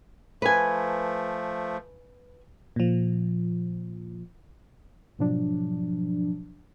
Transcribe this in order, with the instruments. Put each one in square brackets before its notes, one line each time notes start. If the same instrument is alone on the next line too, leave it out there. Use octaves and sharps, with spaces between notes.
[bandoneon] F3 A3 [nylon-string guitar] B4 G#5
[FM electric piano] A#2 F3
[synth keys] G#2 B2 F3 F#3 D4